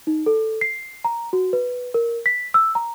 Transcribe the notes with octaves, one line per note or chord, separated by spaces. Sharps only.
D#4
A4
C7
A#5
F#4
B4
A#4
B6
E6
A#5